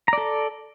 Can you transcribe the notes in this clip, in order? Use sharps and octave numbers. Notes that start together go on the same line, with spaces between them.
A4 D5 A#5